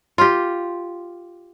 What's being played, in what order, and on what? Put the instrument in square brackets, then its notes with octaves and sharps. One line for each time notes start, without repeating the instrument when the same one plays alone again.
[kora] F4 G4